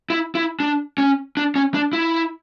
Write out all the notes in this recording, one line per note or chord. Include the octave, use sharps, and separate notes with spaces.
E4
E4
D4
C#4
D4
C#4
D4
E4